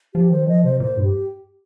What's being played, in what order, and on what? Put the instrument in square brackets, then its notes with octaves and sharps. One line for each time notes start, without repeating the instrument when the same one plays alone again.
[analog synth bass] F3 [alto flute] G4
[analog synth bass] D#3 [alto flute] C5
[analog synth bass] F3 [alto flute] D#5
[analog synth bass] C3 [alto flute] C5
[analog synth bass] A#2 [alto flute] C5
[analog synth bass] G2
[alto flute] G4